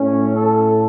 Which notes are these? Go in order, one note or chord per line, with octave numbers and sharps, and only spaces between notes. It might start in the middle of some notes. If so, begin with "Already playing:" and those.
Already playing: A2 A3 C#4
A4